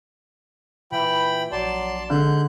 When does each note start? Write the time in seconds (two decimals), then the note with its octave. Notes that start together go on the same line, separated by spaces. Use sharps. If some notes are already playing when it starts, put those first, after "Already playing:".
0.92 A#2 E3 G5 B5
1.52 A#1 F#3 D5 A5 C6
2.10 G#2 D3 F#6 G6